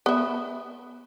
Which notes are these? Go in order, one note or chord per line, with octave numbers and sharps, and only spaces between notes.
B3 E5